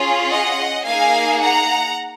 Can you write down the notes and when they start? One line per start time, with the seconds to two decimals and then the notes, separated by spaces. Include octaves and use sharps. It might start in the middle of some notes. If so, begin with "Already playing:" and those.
Already playing: C#4 F4 G#4
0.31 D#5 F#5
0.86 A#3 D#4 G#4 F5 G#5
1.42 F#5 A#5